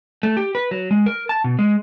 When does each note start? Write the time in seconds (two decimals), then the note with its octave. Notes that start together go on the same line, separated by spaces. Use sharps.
0.23 A3
0.37 G4
0.55 B4
0.71 F#3
0.91 G#3
1.06 A#4
1.29 A5
1.44 B2
1.59 G#3